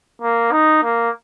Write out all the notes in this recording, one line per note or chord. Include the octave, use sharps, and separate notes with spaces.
A#3
D#4
A#3